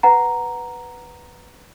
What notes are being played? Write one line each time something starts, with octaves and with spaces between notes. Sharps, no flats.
B4 F#5 A#5